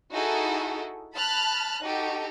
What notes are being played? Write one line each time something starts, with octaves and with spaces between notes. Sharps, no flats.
D#4 E4 F#4 G#4 A4
A5 B5 F6 F#6
D#4 F#4 G4 A4